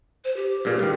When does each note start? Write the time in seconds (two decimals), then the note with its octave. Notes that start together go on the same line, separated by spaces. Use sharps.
0.24 C5
0.36 G4
0.65 G2 A#2 G#4
0.79 G2 D#3